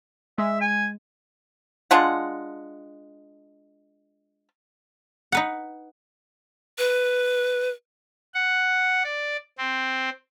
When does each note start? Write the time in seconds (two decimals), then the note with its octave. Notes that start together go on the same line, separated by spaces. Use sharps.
0.38 G#3 E5
0.61 G#5
1.91 G#3 D4 F4 F#5
5.32 D#4 B4 F#5
6.78 B4
8.34 F#5
9.04 D5
9.58 C4